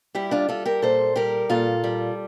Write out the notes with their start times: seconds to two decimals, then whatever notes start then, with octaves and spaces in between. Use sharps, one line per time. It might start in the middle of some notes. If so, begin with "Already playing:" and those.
0.15 G3 E4 G4
0.31 D4 F4
0.49 G3 F4 A4
0.65 G4 A#4
0.82 A#2 A4 C5
1.16 G3 G4 A#4
1.49 A#2 F4 A4
1.84 G3